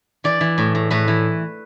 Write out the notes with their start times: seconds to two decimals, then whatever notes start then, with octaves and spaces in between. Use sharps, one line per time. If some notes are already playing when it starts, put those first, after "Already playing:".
0.24 E3 D5
0.41 E3
0.58 A2
0.75 A2
0.91 A2 B4
1.08 E3